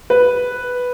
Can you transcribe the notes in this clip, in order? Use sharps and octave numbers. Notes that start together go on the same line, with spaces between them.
B4